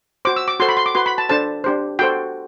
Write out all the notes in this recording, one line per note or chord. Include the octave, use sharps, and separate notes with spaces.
F#4 C5 D6
E6
D6
F#4 A4 C5 C6
B5
C6
D6
F#4 B4 C6
B5
A5
D4 A4 C5 A5
D4 G4 C5
F#4 A4 C5 G5